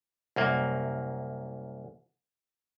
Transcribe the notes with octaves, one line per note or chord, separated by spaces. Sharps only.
C2 F#2 A#3